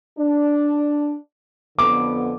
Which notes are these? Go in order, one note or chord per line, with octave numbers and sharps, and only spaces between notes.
D4
F2 D3 B3 D6